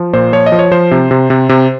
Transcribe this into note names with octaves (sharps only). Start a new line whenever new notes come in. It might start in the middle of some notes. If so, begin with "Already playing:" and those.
Already playing: F3
A#2 C5
F3 C#5
D#5
F3
C#5
F3 C5
C3
C3
C3
C3